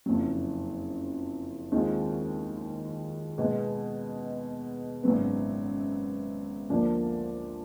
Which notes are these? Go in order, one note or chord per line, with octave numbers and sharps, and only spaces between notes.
F#1 F2 C#3 F#3
D#2 D#3 G#3 C4 F4
B2 G#3 B3 D#4
G#1 F#2 C#3 F#3 B3
D2 D3 F3 A#3 D4